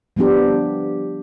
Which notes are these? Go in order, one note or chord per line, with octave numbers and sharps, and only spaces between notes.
F3 G3 B3 D4 G4